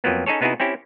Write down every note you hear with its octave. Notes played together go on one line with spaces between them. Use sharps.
F2 F3 F#3 A#3 B3
C#4 D#4 G#4 A4 C#5
C3 B3 D#4 E4 F#4 G#4
C4 C#4 E4 G4